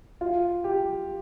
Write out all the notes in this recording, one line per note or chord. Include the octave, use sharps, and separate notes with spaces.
F4
G4